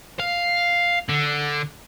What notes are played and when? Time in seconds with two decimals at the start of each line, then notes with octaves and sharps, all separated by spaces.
0.20 F5
1.09 D3